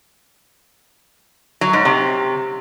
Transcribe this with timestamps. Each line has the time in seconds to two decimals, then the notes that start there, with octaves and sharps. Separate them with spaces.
1.61 F#3
1.73 G#2
1.85 C3